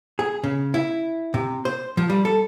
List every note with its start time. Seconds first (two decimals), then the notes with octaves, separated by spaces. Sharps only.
0.19 G#4
0.44 C#3
0.74 E4
1.34 C3
1.65 C5
1.97 F3
2.10 G3
2.25 A4